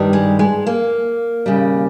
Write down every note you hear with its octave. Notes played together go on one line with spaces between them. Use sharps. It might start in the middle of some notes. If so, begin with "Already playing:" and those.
Already playing: G2 D#3 G3
G#3
G#3
A#3
D#2 C#3 G3